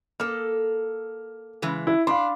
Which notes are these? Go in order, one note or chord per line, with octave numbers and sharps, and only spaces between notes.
A#3 A4 F6
C#3 E3 G#3
E4
D4 F5 B5 C6